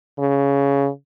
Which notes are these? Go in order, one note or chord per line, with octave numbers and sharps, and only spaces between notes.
C#3